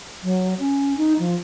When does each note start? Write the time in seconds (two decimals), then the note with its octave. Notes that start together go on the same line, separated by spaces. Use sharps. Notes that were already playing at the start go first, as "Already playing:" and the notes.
0.23 F#3
0.59 C#4
0.97 D#4
1.19 F3